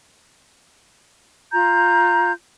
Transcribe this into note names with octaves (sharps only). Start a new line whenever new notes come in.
F4 A#5 G6